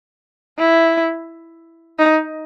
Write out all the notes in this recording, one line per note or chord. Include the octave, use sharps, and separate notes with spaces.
E4
D#4